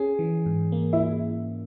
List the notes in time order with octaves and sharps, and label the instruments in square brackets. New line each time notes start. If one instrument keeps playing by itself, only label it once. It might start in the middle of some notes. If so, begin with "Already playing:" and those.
Already playing: [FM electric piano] C#4 [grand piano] G#4
[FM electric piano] E3
G#2
A#3
[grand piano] E4